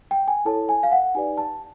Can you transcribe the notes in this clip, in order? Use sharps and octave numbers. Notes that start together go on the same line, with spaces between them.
G5
G#5
E4 A4 C#5 A5
G#5
F5
F#5
D#4 G4 B4 D5 G#5
A5